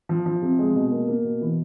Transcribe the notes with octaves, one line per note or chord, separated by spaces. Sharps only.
F3
F3
C3
G#3
B2
A#3
A#3
B2
E3